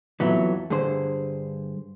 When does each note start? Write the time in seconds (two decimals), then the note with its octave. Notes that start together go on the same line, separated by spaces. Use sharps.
0.20 F2 E3 F#3 B3 E5
0.70 G2 D3 G#4 C5